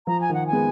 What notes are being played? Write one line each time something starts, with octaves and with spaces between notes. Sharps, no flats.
F3 A#5
G#5
D#3 F#5
G#5
G#3 B3